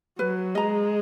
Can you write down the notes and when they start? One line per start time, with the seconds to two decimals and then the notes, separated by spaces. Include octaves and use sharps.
0.19 F#3 B4
0.55 G#3 D#5 A#5